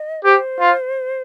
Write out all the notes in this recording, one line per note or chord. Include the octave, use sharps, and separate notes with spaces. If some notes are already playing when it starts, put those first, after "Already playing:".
Already playing: D#5
G4 C5
F4